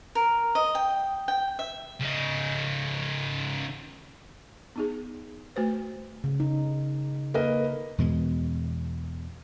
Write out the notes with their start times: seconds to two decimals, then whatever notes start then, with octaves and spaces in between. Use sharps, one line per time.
0.15 A#4
0.55 D#5
0.75 G5
1.28 G5
1.59 E5
2.01 C#3 D#4
4.76 B3 D#4 G#4
5.56 A3 F#4 B4 C5
6.24 C#3
6.40 D#4
7.34 A#3 B4 D#5
7.98 E2 B2 G#3